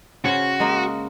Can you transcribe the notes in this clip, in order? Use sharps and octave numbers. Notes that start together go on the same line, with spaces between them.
C#3 C#4 F#4 C5
G#3 A#3 D#5